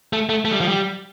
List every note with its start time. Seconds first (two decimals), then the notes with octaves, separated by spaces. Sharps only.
0.13 A3
0.29 A3
0.45 A3
0.52 G3
0.60 F3
0.68 G3